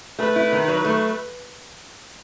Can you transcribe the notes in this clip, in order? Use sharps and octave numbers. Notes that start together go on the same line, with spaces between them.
A3 B4
E4
D#3
F#3
A3